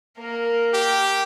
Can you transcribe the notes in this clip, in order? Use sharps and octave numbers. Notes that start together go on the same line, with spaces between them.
A#3 A#4
G4